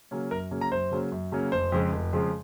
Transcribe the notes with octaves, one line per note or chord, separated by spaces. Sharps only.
C#3 F#3 A#3 C#4
F#2 A#4
C#3 F#3 A#3 C#4
A#5
F#2 C5
C#3 F#3 A#3 C#4
F#2
C#3 F#3 A#3 C#4
F1 C5
F2 C#3 F3 G#3
F1
F2 C#3 F3 G#3